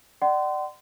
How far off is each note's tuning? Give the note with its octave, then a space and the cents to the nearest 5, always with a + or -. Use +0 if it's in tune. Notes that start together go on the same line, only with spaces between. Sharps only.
D5 +25 F#5 +40 C6 -25